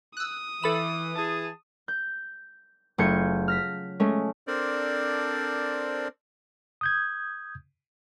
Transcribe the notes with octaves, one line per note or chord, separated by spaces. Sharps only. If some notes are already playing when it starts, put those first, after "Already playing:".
D#6 E6 F#6
E3 A4 B5 E7
E3 G#4 A5
G6
F#1 A3 F4 G6 G#6 C#7
F6 A#6 B6
G#3 A3 C#4
C4 D4 A4 A#4 C5 D5
D#6 G6 G#6